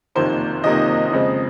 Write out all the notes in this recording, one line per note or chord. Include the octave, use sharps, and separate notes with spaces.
F#1 F2 C3 D#3 A#3 C5
F#1 F2 C3 D#3 A#3 D#5
F2 C#3 G#3 C4